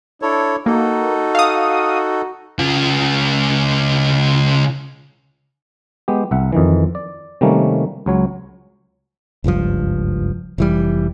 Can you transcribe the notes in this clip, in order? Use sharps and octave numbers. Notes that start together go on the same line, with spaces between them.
D4 E4 A4 C#5
A#3 D#4 F#4 A4
F5 D#6
C#3 F4
G#3 B3 G4
C2 E5 F#5
F2 D#3 E3
D5
C3 D#3 G3 A3 A#3 C#4
C#2 F#3 C#5
F#1 C#2 G2 F3
F1 E3 G3